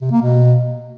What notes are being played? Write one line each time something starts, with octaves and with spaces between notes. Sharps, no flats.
C3
A#3
B2